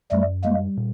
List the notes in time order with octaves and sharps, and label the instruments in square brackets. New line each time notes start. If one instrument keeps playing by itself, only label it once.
[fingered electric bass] F#2 [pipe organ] G3 A3
[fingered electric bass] G3 [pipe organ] G#3 A#3
[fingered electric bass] A#2